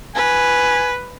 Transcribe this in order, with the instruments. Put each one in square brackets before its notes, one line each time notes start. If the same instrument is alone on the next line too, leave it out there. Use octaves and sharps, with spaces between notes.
[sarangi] B4 [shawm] G#5